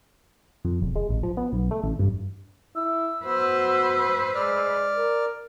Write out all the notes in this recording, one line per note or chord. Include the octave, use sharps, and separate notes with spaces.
F2
E1
G#3
A1
F3
B3
B1
A3
A1
G2
E4 E6
B3 F#4 B4 C5
G#3 D5 F6
A#4